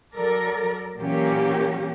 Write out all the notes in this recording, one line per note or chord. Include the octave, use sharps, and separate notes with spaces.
F#3 A4 A#4 D5
A#2 E3 F#3 A#3 C#4 G4